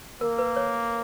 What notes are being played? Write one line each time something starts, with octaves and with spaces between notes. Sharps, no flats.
A#3 A#4
B4
C#5